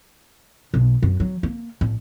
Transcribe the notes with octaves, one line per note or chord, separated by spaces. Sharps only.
B1
F#2
F#3
A#3
A1